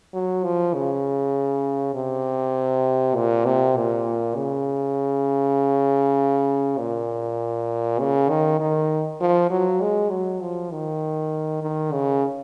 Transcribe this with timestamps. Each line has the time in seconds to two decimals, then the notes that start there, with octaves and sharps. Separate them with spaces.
0.14 F#3
0.44 F3
0.74 C#3
1.94 C3
3.15 A#2
3.46 C3
3.76 A#2
4.36 C#3
6.78 A#2
7.99 C#3
8.29 D#3
8.60 D#3
9.21 F3
9.50 F#3
9.81 G#3
10.10 F#3
10.41 F3
10.71 D#3
11.62 D#3
11.93 C#3